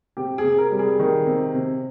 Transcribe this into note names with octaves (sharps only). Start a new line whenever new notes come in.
C3 G4
G#4
C3
A#4
G3
G#4
D#3
C3
C3